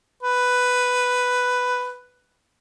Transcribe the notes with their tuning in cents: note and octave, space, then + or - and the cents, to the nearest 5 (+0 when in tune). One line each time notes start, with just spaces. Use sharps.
B4 +5